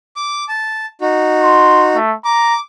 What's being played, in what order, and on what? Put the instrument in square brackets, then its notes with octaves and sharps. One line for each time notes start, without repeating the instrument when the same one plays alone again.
[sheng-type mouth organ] D6
A5
D#4 F#4
[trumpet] C6
A3
[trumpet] A#5 [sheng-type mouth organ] D6